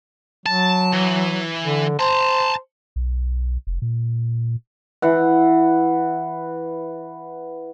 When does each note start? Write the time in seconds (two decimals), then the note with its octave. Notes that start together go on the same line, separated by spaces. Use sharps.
0.46 F#3 A5
0.93 E3
1.63 D3
1.99 C5 A5 A#5
2.96 B1
3.67 F1
3.82 A#2
5.02 E3 F#5